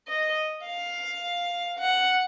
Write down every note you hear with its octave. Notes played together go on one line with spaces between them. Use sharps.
D#5
F5
F#5